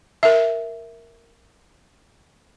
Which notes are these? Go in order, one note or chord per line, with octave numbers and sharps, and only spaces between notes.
A#4 E5